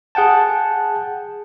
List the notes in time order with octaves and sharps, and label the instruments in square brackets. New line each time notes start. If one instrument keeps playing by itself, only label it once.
[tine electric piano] G#4 F#5 G5 A5